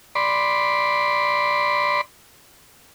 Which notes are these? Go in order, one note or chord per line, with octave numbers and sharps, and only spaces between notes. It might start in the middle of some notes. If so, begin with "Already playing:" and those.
D5 B5 C6